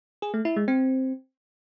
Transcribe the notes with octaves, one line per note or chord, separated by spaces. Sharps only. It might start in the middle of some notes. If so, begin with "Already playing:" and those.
G#4
A3
E4
G#3
C4